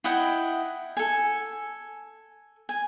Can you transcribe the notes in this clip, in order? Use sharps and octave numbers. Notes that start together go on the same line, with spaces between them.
E4 D#5 F#5 G5
A4 G#5
G#5